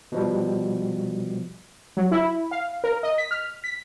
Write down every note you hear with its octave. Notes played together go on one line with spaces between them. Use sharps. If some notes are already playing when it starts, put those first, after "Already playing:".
B2 F3 G3
F#3
E4
F5
A#4
D#5
B6
F6
B6